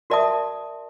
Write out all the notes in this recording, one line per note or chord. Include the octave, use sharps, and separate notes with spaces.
F#4 A#4 D5 E5 A5 D#6